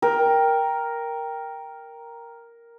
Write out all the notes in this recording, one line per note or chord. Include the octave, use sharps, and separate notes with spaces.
A#4 G5